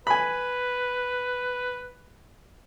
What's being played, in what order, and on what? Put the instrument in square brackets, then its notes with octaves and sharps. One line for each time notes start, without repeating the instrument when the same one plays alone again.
[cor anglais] B4 [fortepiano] G#5 B5